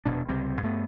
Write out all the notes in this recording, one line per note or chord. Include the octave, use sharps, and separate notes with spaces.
F1 E2 B2 D4
C#2 C3 G3 C4
G2 A3 B3